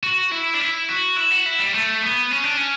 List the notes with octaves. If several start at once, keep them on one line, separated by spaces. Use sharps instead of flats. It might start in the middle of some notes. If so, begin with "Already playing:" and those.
F#4
E4
D4
E4
F#4
E4
F#4
E4
G3
A3
B3
C#4
D4
C#4